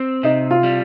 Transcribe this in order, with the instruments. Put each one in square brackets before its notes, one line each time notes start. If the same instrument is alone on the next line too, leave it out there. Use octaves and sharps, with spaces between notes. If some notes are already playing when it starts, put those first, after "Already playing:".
Already playing: [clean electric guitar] C4
[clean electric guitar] C3 [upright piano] D#4
[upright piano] F4
[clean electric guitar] G3